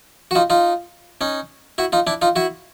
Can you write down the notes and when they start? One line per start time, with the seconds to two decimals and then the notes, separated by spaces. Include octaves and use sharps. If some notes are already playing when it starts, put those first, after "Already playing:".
0.31 F#4
0.35 D#4 F4
0.50 D#4 F4
1.21 C#4 D#4
1.78 E4 F#4
1.92 D#4 F4
2.07 D4 E4
2.22 D#4 F4
2.36 E4 F#4